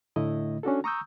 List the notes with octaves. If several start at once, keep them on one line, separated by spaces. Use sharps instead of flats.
A2 D3 A3 E4 D#5
C#4 D4 F#4 A4
A#5 C#6 D#6 E6 G6